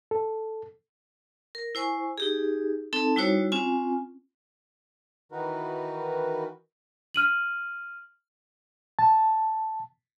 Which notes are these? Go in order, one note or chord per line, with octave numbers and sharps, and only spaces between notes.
A4
A#4
E4 C5 G#5 C#6
D#4 G4 G#4
C4 D#4 A4 A5
G3 D#4 E4 F#4 C5 C#5
C4 C#4 F4 G#5
D#3 E3 D#4 F#4 A#4 B4
F6 D#7 F#7
A5